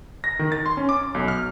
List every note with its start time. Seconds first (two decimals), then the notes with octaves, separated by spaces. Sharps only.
0.24 A#6
0.39 D#3
0.52 A6
0.66 C6
0.77 C#4
0.89 D6
1.03 D6
1.14 B1
1.28 F6